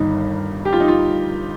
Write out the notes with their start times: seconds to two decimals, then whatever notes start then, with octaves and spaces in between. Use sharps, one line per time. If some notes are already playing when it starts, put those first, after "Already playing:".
Already playing: G1 G2 D#3 D#4
0.65 G4
0.73 F4
0.80 D#4
0.88 F4